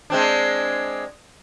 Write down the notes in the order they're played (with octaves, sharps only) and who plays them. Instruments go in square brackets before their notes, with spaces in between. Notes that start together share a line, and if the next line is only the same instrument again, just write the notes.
[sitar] G#3 C4 D4